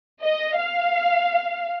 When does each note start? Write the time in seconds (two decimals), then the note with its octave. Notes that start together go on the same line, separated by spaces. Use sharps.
0.22 D#5
0.59 F5